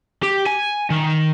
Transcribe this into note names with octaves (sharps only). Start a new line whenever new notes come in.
G4
G#5
D#3